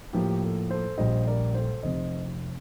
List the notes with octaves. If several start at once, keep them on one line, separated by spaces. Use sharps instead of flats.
A2 F3 A#3 G4
A4
A4 C5
A#1 A#2 G3 C5 D#5
A#4 D5
A4 C5
F1 F2 C3 C5 D#5